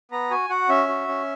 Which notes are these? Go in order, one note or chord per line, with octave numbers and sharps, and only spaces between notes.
B3 A#5
F#4 G#5
F#4 F#5
C#4 E5
F#4
C#4